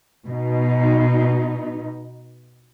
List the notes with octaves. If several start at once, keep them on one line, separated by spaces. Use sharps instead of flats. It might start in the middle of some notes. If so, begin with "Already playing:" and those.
B2 D#4